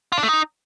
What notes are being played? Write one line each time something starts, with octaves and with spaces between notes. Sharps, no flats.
F4
D4
A3
D#4